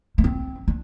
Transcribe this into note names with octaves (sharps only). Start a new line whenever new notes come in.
A3
C4
D4